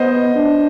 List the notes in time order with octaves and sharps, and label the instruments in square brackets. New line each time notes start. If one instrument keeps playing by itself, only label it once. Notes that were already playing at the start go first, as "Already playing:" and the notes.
Already playing: [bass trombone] B3 [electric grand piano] C5 D#5
[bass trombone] D4